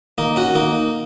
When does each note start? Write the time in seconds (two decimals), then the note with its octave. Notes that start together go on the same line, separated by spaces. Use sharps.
0.18 D#3 A#3 D#4
0.36 C#4 F#4
0.55 D#3 A#3 D#4